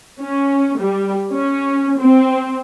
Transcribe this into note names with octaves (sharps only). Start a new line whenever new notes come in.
C#4
G3
C#4
C4